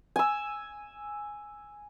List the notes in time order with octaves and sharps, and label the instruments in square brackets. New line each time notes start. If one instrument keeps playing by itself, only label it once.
[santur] G#5 E6